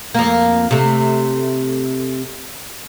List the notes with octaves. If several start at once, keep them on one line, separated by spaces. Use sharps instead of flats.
F2 A#3
C3 A3